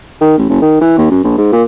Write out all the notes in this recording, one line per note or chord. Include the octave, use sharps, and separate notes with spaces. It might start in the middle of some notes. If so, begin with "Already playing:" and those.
D#3
A1
F#1
D#3
E3
D#2
F#2
A#1
G#2
A#2